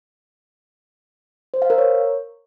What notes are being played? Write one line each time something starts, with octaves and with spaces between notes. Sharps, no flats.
C5
F5
A#4
C#5